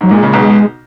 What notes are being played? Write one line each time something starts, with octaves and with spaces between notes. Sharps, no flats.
G#2 F#3
A#2 G#3
C#3
B1 B2